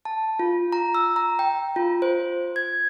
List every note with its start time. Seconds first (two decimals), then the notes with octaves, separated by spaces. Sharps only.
0.05 A5
0.39 F4
0.72 A#5
0.95 E6
1.16 A#5
1.39 G5
1.76 F4
2.02 C5
2.56 G#6